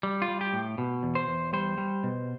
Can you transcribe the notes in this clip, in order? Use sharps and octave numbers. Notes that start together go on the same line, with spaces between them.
G3
F4
G3
G4
A2
B2
E2
C5
E2
G3 C5
G3
B2